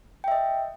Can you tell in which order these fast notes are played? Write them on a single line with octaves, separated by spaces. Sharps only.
G5 E5 D#5